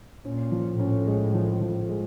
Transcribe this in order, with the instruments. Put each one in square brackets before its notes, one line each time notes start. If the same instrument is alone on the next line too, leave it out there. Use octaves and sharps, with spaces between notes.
[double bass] A#2 [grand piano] C#4
[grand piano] F3
[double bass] A2 [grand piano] C#4
[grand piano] G#3
F3
F3
G#3